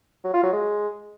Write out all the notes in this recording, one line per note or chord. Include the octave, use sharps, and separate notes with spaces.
F#3
F4
F#3
G#3